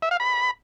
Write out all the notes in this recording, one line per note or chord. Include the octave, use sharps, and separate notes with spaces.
E5
F5
B5